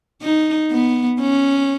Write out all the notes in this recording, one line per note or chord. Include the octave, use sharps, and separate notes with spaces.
D#4
B3
C#4